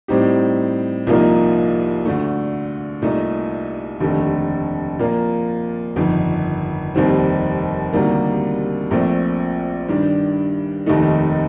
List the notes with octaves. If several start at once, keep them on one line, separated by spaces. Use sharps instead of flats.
A2 G3 C4 D#4 G4
C2 A#2 F3 A#3 D#4
D2 D3 A3
C2 A#2 A3 D#4
F1 D#2 D3 A3
A#2 F3 A#3 F4
G1 F2 D#3
F1 D#2 D#3 G3 C4
D2 C3 D#3 G3 A#3
A#1 A#2 A3 C4
G2 D#3 G3 D4
F1 D#2 D#3 A3 D#4